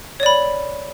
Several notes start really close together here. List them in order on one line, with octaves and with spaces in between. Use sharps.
C#5 D5 B5